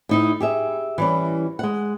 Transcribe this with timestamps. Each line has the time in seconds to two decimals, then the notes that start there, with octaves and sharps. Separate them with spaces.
0.09 A2 D#4 E4
0.40 G4 G#4 E5
0.98 E3 G3 C#4
1.59 G#3 F#5